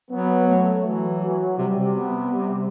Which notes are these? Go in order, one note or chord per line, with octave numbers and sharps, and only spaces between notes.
F#3 B3
A3
E3 F#3
F#3
C3 G3
C3
B3
G3